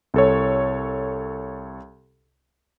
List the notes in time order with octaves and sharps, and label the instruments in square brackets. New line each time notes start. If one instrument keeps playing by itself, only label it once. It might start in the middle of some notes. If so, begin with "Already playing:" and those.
[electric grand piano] C2 A4 C#5